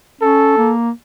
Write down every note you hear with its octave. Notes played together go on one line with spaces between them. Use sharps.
C#4 A4
A#3